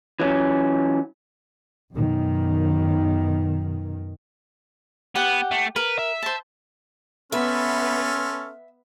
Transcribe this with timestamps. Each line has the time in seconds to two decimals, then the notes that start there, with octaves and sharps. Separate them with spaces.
0.20 E3 F#3 C#4
1.93 F#2 B2 D#3
5.16 B3 G4 F#5
5.51 A3
5.76 A#4 B4
5.99 E5
6.22 C5 A5
7.32 B3 C#4 A4 B4 E5 C6 F6